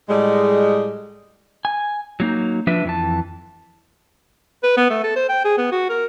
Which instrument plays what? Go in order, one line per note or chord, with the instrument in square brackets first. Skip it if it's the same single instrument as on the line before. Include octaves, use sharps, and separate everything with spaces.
[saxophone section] A2 G3 G#3
[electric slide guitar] G#5
F#3 A#3 D#4
F3 D4 B4 E5
F2 E3 A5
[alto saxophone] B4
B3
A3
A4
C5
G5
G#4
B3
F#4
A#4